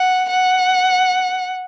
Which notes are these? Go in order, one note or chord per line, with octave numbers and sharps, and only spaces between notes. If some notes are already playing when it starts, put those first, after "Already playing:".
Already playing: F#5
F#5